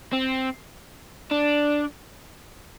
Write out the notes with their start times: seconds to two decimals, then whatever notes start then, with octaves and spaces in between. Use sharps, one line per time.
0.13 C4
1.31 D4